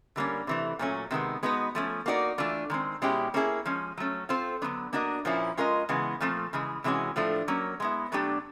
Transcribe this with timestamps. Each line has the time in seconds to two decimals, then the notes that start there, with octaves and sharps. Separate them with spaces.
0.16 D3 G3 A#3 C#4
0.47 C3 E3 A3
0.79 A#2 F#3 A3 C#4
1.11 C3 D#3 G#3 B3
1.43 G#3 B3 D#4 F#4 B4
1.75 F3 A3 C#4
2.06 A#3 D#4 F#4 A4 D5
2.38 E3 A3 D4 F4
2.70 D#3 G#3 C4
3.02 B2 G#3 C#4 E4 G4
3.34 A#3 C#4 E4 G#4
3.65 F3 G#3 C#4
3.97 F#3 A3 C#4
4.29 C4 F4 A4 C5
4.62 D3 F#3 B3 D4
4.93 A#3 D4 F#4 A#4 D#5
5.25 A#2 F3 A#3 C#4 E4
5.57 G#3 C#4 F4 A#4 D#5
5.89 C#3 E3 G#3 B3
6.20 A#2 F3 A3 C4
6.53 C#3 E3 G#3
6.84 C3 E3 G#3 C#4 F#4
7.16 A2 F3 A3 D4
7.48 F#3 A#3 C#4
7.80 G#3 B3 E4
8.12 B2 F#3 A3 D4 G4